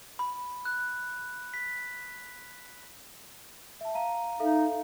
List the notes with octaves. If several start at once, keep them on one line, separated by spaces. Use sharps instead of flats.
B5
F#6
B6
E5 A5
F5 A#5 D#7
D#4 A4 E5 F5